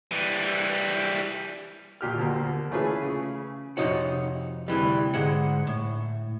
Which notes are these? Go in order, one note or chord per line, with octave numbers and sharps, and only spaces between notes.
E3 G3
D#2 A#2 G4 F6
D2 B2 A#3
E3 A3 C#4 F4 G#4 B4
C#3
F2 C3 D#4 F#4 C#5 F#5
D2 C3 E3 G3
G#2 D3 G#3 F#5
A2